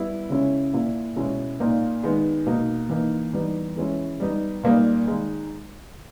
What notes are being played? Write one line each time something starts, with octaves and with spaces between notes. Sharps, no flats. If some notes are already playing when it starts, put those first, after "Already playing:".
Already playing: G3 B3 E4
C#3 G#3 C#4 E4
A#2 A#3 E4
B2 G#3 C#4 E4
A#2 A#3 D#4
D#3 G#3 B3
B2 A#3 D#4
E3 A#3 D#4
E3 G3 B3 D#4
E3 G#3 C#4 E4
G3 B3 D#4
A#2 G3 A#3 D#4
D#3 G#3 D#4